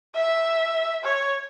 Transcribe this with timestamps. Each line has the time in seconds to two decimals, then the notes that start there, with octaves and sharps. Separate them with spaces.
0.15 E5
1.04 C#5